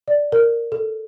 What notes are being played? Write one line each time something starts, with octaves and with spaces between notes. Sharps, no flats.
D5
A#4
A4